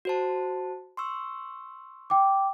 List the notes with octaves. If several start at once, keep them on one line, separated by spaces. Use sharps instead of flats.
F#4 C5 A5
C6 C#6 E6
G5 D6